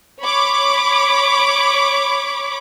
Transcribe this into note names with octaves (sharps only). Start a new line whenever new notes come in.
C#5 B5 D6